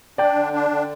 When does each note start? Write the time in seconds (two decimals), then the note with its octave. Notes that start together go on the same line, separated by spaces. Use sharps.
0.18 D4 D5 G5
0.36 D3
0.53 D4
0.70 D3